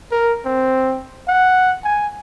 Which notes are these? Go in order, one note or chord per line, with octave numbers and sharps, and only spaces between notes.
A#4
C4
F#5
G#5